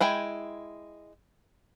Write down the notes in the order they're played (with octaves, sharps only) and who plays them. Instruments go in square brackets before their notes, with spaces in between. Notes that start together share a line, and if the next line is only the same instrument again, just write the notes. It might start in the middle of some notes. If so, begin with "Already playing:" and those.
[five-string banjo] G#3 E4 G5 G#5